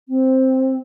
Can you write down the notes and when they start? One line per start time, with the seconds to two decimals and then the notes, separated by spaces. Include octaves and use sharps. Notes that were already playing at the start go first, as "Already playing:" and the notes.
0.09 C4